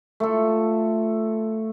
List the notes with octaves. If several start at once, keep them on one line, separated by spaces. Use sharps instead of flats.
A3 F4 A4